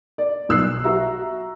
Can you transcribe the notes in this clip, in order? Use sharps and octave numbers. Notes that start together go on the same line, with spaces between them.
D5
B1 E6 F#6 C7
F#4 E5 A#5